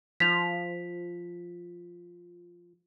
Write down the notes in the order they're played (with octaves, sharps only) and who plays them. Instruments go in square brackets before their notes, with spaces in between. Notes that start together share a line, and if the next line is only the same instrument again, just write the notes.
[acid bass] F3 [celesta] B6 F7